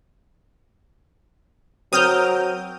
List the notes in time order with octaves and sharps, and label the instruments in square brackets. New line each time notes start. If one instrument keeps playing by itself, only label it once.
[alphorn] F#3 [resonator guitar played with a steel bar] C4 A#4 [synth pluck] D#6 F6 G6